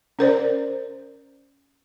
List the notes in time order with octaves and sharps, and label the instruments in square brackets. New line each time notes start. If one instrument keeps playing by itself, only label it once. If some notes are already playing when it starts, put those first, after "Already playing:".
[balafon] C#4 A#4 C5 D5